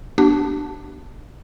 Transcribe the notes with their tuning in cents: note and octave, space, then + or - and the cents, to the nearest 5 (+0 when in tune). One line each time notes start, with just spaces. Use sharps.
B3 -15 D4 +0 G4 -45